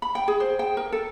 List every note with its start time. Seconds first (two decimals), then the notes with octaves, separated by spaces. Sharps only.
0.02 B5
0.15 G5
0.28 G#4
0.40 C5
0.59 G5
0.77 A#4
0.92 A4